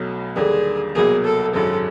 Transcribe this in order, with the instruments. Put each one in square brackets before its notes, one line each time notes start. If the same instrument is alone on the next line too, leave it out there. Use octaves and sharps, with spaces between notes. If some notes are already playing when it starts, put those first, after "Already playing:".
Already playing: [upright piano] B1 B2 F#3 A3
[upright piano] D#2 D3 G3 A#3 [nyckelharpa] G#4
[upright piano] C2 B2 F#3 A#3 [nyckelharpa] G#4
[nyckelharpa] A4
[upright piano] G#1 F#2 C#3 F#3 [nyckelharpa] A4